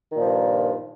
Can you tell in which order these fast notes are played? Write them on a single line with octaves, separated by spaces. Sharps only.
D#3 A#2 F3 G2